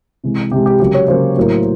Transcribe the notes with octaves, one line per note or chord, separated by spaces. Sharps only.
C3 E3 G#3
C3 E3 G#3 G4
G4
C#3 F#3 A#3 G4
C#5
C#3 F#3 A#3 C5
A2 F#3 A#3